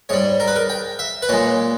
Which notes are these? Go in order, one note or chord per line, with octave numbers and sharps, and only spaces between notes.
G#2 G3 C#5
A#4
B4
A#4
G5
E5
B4
A#2 G#3 C#5